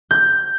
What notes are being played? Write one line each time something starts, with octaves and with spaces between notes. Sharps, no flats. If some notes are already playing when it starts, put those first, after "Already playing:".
G6